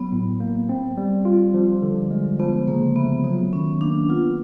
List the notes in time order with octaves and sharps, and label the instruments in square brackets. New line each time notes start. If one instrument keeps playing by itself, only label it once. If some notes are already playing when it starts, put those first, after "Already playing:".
Already playing: [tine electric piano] F#3 [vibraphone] B3
[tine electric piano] A2
A#3
C4
G3
F4
F3
D3
G#3
[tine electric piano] F3 [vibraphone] B3
[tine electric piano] C#3 [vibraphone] A#3
[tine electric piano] A3 [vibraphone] B3
[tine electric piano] F#3 [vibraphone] B3
[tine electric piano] D#3 [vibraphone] C#4
[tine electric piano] A#3 [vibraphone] D4
[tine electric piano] B3 [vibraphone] F4